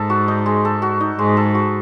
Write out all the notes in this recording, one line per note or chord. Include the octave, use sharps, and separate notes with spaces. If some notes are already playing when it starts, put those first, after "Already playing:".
Already playing: G#2 A4
F#4
D#4
G#3
A4
F#4
D#4
G#2 G#3
A4
F#4